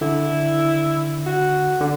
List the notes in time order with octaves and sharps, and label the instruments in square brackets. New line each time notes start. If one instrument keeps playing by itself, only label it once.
[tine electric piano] D3 [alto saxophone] E4
[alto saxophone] F#4
[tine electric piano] D3